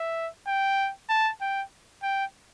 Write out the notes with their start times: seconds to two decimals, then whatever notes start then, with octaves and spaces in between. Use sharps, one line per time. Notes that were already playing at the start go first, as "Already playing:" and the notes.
Already playing: E5
0.47 G5
1.09 A5
1.41 G5
2.03 G5